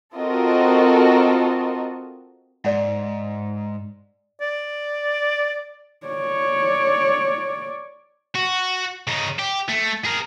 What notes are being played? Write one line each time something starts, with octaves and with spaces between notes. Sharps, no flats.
C4 F4 F#4 A4 A#4 D#5
G#2 D5 F#5
D5
C#5 D5
F#4
C#3 D#4
G4
A3
G#4 A#4